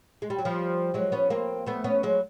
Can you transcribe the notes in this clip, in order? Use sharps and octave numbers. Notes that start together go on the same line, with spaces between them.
G#3
G3
F#3
F3 G3
F#3 G#3
B3 C#4
A#3 C4
A3 B3
B3 C#4
F#3 G#3